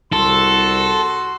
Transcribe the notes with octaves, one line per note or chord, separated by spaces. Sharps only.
C2 F#4 A4 C6